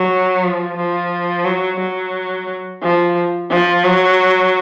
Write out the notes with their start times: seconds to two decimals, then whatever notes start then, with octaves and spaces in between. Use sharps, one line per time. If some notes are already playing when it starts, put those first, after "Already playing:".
Already playing: F#3
0.44 F3
0.77 F3
1.45 F#3
1.80 F#3
2.82 F3
3.50 F3
3.84 F#3